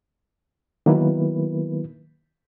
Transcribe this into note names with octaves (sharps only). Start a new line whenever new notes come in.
D#3 F#3 A#3 B3 E4 B4